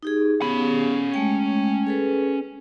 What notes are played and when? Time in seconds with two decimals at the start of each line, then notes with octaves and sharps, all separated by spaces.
0.03 D#4 G4 G#4
0.41 B3 C#4 G4 G#4 B5
1.14 G#3 A3 G5
1.87 G#4 A4 B4